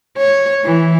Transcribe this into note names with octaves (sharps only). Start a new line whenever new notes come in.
C#5
E3